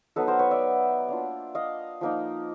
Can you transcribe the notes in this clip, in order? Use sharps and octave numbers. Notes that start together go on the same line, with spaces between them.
F#3 B3 D#4 A4 B4
A#4 C5
B4 C#5
D5 E5
A#3 D4 F4
D#5 F5
F3 A#3 D#4